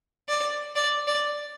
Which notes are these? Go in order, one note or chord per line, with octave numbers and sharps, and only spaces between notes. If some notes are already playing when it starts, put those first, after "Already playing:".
D5
D5
D5